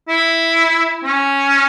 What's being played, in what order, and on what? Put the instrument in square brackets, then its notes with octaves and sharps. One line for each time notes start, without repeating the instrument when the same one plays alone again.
[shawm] E4
C#4